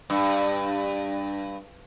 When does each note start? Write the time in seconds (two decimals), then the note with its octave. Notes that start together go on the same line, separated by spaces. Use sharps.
0.10 G2